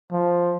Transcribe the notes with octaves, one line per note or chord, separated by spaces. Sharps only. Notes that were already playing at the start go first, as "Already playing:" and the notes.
F3